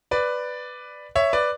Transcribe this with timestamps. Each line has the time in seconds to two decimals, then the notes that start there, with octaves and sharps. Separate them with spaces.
0.11 B4 D5
1.16 C#5 E5
1.33 B4 D5